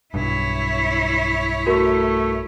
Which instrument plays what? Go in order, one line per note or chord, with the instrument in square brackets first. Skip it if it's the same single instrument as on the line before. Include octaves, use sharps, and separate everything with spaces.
[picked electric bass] B1 G2 [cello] E4 C#5
[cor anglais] A3 [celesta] F#4 A#4